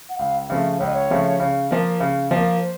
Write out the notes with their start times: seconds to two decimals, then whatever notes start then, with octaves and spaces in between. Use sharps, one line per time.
0.09 F#5
0.19 C#2 F5
0.50 C#3 F3 A3
0.79 C#2 C#5
0.87 D#5
0.94 C#5
1.10 C#3 F3 A3
1.40 C#3
1.71 F3 A#3
2.00 C#3
2.31 F3 A#3
2.61 C5